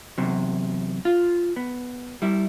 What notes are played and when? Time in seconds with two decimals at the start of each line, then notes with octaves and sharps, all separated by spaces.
0.18 E2 C3 F#3
1.05 F4
1.56 B3
2.22 G3 E4